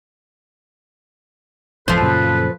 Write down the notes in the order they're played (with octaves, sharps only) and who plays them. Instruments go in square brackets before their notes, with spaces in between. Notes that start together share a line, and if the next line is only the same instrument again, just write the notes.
[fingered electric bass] F#1 F2 [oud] F3 C5 [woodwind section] A4 B4
[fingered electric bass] F#2 A#2 C#3